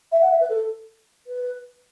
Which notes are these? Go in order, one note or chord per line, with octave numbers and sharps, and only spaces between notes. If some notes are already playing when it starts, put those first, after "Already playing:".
E5
F#5
E5
B4
A4
B4